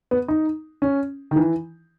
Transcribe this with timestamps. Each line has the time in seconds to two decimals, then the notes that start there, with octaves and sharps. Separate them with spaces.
0.11 B3
0.28 D#4
0.82 C#4
1.31 D#3
1.36 E3